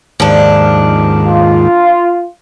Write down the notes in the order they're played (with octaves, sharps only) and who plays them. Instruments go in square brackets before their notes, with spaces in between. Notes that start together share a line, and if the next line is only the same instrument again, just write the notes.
[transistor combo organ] D#2 G#2 [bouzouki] F3 D4
[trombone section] F4